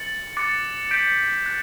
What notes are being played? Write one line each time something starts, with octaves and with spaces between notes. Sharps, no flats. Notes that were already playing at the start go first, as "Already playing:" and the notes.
Already playing: A6 C#7 F#7
D6 F#6 A6 C#7
G6 B6 D7 F#7
F#6 A6